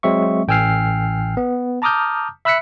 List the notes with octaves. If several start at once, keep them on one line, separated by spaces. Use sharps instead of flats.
F#3 G#3 C4 E5 C#6
A1 G5 G#5 E6 F6 C7
B3
A5 A#5 D6 D#6 F6 G6
E5 B5 E6 F#6 B6 C#7